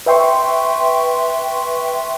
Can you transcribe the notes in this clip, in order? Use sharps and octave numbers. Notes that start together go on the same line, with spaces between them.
B4 E5 G5 C6 C#6